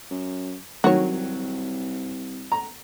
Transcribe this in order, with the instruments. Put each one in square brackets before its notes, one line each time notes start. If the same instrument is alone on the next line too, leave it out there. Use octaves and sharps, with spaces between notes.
[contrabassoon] F#2
[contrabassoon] C2 [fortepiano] D#3 F#3 [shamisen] F#4 C#5
[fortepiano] A#5